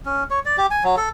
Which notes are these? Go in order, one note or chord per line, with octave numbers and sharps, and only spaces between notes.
C#4
C#5
D5
G4
G#5
F#3
A4